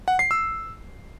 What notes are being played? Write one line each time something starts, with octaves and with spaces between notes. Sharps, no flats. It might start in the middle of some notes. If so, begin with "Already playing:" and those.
F#5
C7
E6